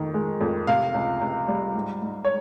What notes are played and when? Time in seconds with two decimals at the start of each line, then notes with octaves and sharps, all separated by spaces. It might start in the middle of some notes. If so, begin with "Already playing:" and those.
Already playing: F2 D#3
0.14 G#3
0.41 F2
0.67 C3 F5
0.94 C#2
1.21 C#2
1.48 G3
1.75 G#2
2.02 G#2
2.25 C#5